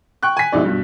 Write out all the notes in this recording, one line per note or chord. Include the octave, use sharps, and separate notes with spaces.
G5 C#6 F#6
G#5 B6
A#1 B2 G#3 D#4 E4 D5
G2 B2